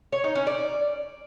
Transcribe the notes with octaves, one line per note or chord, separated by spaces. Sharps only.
C#5
D#4
C#4
D5